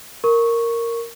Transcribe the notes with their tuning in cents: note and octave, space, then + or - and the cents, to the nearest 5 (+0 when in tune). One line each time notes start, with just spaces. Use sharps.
A#4 -5 C#6 +0